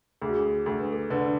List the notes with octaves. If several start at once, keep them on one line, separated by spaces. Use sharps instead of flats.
D2 G#4
F#4
G#4
D2 A4
B4
A4
D3 B4